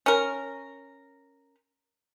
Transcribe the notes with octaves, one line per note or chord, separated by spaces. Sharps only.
C#4 A#4